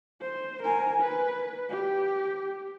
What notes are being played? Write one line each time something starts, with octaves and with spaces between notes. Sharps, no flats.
C5
A#4 G#5
B4
G4